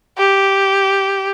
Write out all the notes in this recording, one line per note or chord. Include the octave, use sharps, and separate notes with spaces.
G4